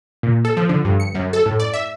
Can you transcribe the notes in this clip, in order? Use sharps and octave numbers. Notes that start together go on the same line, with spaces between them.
A#2
A4
F3
D3
G2
C#7
F#2
A4
A2
D5
E5